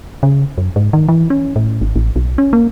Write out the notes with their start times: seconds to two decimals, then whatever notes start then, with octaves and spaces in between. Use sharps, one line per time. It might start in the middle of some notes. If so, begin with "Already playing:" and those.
0.23 C#3
0.58 F#2
0.76 G#2
0.93 D#3
1.08 E3
1.30 C#4
1.56 A2
1.81 G#1
1.96 A1
2.16 B1
2.38 C#4
2.53 A#3